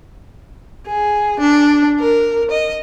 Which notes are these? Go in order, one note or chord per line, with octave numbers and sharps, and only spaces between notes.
G#4
D4
A#4
D#5